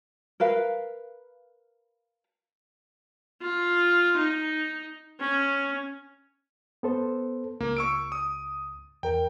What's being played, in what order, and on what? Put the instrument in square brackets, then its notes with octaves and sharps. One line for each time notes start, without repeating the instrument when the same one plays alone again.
[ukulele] A#4 B4 F5
[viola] F4
D#4
C#4
[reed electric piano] B3 A4 C5
[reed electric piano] C#2 [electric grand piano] A#3
[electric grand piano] C#6 E6 D7
D#6
[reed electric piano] E2 A#4 [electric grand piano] G5